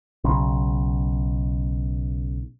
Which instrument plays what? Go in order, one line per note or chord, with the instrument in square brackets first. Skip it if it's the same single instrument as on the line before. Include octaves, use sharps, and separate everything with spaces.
[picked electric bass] B1 C#3